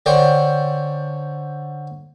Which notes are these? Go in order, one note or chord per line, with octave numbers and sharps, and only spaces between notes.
D3 D4 C5 C#5 G5